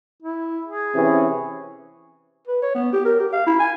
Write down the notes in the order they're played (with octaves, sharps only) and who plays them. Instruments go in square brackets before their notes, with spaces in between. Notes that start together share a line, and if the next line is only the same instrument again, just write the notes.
[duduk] E4
G#4
[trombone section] C3 E3 C#4
[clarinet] B4
C#5
B3
G4
A#4
G4
F5
E4
G#5